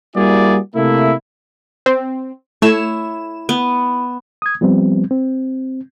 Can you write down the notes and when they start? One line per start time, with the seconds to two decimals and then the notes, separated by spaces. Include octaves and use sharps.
0.16 G3 A#3 E4 F#4 G#4 D5
0.75 C3 A3 A#3 E4
1.86 C4
2.62 A3 E4 C#5 E7
3.49 B3
4.42 D#6 G#6
4.61 F3 G3 B3 C4
5.11 C4